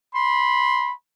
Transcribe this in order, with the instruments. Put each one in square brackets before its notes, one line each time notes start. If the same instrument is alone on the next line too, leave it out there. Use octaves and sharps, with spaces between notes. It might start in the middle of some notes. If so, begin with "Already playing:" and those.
[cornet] B5 [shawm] C6